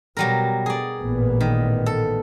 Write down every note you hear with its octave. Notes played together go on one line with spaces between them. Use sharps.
B2 F#3 G3 A#4
G#4 D5
A1 A#2 B3
D#3
A4